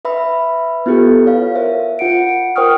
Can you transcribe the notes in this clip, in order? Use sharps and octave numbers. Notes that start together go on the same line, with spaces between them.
B4 E5 B5 E6
B3 E4 F4 G4 A4 B4
C#5 F5
A#4 C5 E5
F4 F#5 C#7 D7
A#4 C5 G5 C#6 D#6 F6